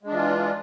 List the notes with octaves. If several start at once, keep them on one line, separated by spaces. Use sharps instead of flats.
E3 G#3 D4 F4